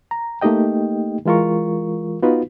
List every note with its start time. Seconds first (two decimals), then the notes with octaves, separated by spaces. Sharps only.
0.11 A#5
0.41 A3 A#3 D#4 G4 D#5 G5
1.26 E3 G#3 F4 A#4 C#6
2.22 B3 D#4 F4 F#4 B4